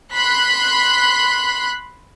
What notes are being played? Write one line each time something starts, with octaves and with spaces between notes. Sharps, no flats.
B5 C6 F#6 B6